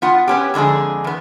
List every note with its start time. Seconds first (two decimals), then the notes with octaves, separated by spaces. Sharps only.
0.02 B3 F4 F#5
0.28 B3 C#4 G4
0.54 F2 D3 G#3 D4 G#4
1.04 E2 B3